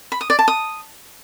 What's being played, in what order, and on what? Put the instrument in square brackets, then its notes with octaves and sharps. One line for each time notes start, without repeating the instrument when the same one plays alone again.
[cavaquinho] B5
D#6
D5
A5
D#6